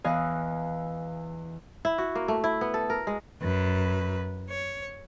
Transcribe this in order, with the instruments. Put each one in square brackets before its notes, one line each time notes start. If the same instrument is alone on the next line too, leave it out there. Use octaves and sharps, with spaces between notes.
[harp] E2 E3 D#5 F5 G#5 F#6
[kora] E4
F#4
A#3
A3
E4
B3
A4
A#4
G#3
[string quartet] F#2 B4
C#5